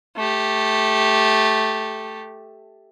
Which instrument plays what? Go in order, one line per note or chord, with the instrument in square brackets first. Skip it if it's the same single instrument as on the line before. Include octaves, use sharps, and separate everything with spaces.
[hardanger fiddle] A3 G4